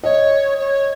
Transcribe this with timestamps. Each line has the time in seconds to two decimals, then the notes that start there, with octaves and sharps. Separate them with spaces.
0.04 C#5 D#5
0.58 C#5